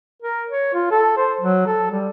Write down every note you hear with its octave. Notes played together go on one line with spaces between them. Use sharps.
A#4
C#5
F4
A4
C5
F#3
A4
G3